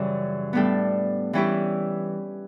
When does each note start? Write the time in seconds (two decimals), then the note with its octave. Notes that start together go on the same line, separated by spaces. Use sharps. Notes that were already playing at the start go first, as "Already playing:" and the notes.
Already playing: F#2 C#3 E3 G3
0.53 A2 G3 B3 D4 A4
1.33 E3 G3 C#4 E4 G4